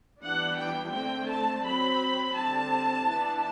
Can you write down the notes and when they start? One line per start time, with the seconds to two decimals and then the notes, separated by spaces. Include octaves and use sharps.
0.21 E3 G3 B3 D4 F#5
0.58 G5
0.92 D3 A3 C4 G5
1.28 A5
1.64 F#3 C4 B5
2.35 D3 G3 C4 A5
3.07 E3 B3 D4